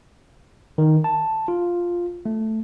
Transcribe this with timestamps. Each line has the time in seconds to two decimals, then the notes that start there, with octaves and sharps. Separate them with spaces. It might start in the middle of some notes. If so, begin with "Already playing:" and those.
0.78 D#3
1.04 A5
1.48 F4
2.26 A3